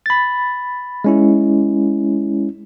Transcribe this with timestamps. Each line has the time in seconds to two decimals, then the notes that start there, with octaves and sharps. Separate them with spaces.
0.06 B5 A6
1.04 G#3 C#4 E4